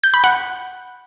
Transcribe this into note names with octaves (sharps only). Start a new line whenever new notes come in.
G6
B5
F#5